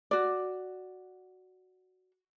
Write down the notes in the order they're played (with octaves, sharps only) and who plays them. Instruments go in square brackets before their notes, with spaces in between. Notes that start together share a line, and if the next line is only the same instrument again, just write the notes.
[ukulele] F#4 D5